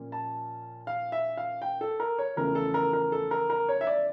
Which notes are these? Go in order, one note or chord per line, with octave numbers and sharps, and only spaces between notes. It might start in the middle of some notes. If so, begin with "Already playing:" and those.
Already playing: A#2 F3 A#3 C#4
A5
F5
E5
F5
G5
A4
A#4
C#5
E2 C#3 F3 A3 C#4 A#4
A4
A#4
A#4
A4
A#4
A#4
C#5
E5
D5